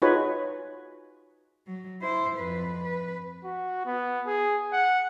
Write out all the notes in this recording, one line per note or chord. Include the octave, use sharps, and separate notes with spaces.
D#4 F4 F#4 G#4 B4 C#5
F#3
E4 C5
F2 B4
B4
F#4
B3
G#4
F#5